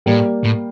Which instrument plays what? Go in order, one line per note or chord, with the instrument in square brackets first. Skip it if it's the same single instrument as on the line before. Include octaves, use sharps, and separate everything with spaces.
[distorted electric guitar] A2 [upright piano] G3 A#3
[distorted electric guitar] A2